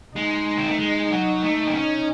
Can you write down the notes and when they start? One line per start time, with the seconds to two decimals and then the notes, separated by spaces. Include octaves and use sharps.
0.16 G#3 D#4
0.57 C4
0.69 A3
0.79 G#3
1.11 F#3
1.43 A3
1.68 C4
1.74 C#4